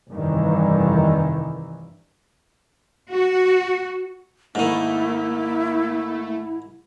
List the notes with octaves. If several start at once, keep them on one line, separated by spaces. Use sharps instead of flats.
F1 G2 D#3 E3
F#4
G#2 D#3 A3 A#3 E4